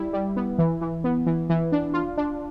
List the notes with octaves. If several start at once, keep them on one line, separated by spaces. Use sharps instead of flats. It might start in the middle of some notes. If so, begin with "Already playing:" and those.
Already playing: G3 E4
G3
B3
E3
E3
B3
E3
E3
D4
F4
D4